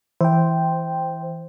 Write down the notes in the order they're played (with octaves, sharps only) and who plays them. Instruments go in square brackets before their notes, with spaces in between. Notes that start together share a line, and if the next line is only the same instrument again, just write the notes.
[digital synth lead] E3 [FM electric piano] C5 G5